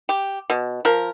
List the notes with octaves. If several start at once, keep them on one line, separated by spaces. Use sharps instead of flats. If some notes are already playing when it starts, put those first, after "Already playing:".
G4
B2
F3 A#4